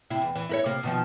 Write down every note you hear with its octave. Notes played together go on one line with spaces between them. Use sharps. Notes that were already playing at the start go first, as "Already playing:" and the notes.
C3 E4
E2
E3
E4 A#4 C#5
C3 A#3
B2 D#3 F3